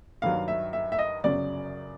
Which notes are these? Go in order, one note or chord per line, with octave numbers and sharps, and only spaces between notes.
G2 D#3 F#3 F5
E5
E5
E5
D#5
G1 F#2 C#3 F#3 D5